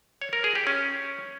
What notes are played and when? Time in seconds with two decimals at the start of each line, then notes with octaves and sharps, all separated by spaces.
0.22 C#5
0.33 A#4
0.44 G#4
0.55 G4
0.67 C#4